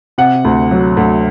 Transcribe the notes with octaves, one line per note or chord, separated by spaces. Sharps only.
C3 F#5
D2
F#3
D2